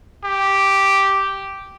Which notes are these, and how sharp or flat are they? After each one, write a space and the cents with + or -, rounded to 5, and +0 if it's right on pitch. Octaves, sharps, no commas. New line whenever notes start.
G4 -5